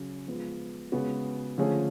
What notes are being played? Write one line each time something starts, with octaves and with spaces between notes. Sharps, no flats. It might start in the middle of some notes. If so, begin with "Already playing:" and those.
Already playing: C#3 F#3 C#4
F3 G#3 B3 F4
C#3 G#3 B3 F#4
D3 F3 A3 C#4 G#4